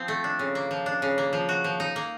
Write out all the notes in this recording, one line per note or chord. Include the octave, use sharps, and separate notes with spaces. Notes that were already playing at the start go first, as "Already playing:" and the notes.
Already playing: F3 C4
A3
D4
C#3
A#3
F3
D4
C#3
A#3
F3
F#4
F3
D#4
A#3